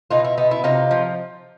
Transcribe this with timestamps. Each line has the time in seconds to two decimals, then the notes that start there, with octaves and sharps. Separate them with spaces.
0.11 B2 D#4 F4
0.25 E4
0.38 B3 D#4
0.51 E4
0.64 C3 D#4 F4
0.91 F3